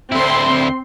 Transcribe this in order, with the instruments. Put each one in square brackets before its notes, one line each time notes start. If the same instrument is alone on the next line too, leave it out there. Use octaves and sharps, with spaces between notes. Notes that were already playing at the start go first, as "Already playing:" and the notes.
[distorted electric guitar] D2 E4 [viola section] C4 C6